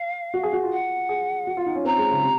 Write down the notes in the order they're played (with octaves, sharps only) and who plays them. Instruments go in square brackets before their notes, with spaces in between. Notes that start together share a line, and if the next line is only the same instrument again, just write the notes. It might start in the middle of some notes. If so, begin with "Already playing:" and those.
Already playing: [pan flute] F5
[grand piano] F#4
G#4
F#4
F4
[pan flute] F#5
[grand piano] G#4
F#4
F4
D#4
C#4
[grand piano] C4 [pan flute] A#5
[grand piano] G#3
C#3
C3